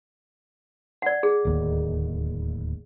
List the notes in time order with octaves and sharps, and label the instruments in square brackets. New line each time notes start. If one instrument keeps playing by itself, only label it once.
[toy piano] D5 F#5
G#4
[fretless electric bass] D1 D#2